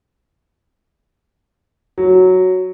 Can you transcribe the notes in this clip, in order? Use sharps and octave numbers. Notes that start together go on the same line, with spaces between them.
F#3